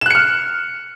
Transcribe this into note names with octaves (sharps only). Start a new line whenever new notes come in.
F6 F#6 C#7 E7